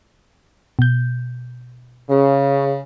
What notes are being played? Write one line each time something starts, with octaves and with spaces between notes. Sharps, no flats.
B2 G6
C#3